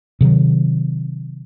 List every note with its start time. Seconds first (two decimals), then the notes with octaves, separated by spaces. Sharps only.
0.21 C3 D#3 F#3